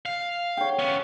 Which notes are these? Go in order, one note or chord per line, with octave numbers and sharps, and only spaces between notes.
F5
C#5 G5
B3 C#4